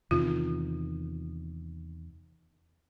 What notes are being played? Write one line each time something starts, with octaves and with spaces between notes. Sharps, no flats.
E2 C3 D#3 F4